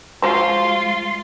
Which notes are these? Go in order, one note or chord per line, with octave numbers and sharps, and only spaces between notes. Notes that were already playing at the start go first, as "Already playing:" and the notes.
F3 G#3 F4 F#4 C5 C6